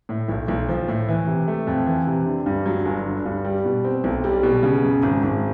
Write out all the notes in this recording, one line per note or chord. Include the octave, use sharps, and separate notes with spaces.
A2
B1
B1
F3
A2
E3
C3
A3
F2
E3
C3
D3
G2
F#3
G1
D3
G2
G3
B2
C4
B1
G3
B2
C#3
F#2
G#1
G#1